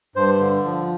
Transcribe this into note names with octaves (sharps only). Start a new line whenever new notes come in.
G2 C5
D3
F3